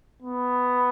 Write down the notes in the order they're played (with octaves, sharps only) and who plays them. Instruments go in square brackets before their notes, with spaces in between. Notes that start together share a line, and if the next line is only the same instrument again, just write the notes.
[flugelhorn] B3